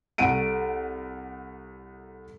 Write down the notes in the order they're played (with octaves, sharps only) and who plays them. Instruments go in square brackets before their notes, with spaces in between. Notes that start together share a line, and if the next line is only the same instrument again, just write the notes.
[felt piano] C2 A3 A4 F#5 D7 D#7